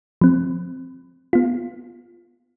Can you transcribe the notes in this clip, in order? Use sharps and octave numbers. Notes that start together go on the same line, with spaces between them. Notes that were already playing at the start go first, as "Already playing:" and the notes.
F3 C4
B3 F4